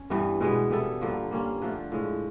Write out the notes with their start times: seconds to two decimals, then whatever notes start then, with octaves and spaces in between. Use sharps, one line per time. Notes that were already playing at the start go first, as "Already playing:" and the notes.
Already playing: C#4
0.10 G2 E3 G3 B3
0.40 B2 G#3 B3
0.71 G3 B3 E4 A4
1.01 G2 D3 F3 A#3
1.31 G3 A#3 C#4 F4
1.62 D3 F3 A3 D4
1.92 A2 F3 G#3